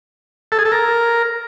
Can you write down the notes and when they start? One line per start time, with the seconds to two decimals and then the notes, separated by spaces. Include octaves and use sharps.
0.52 A4
0.59 G#4
0.65 A4
0.72 A#4